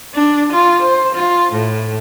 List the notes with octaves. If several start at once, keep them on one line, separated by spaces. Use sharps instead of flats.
D4
F4
C5
F4
A2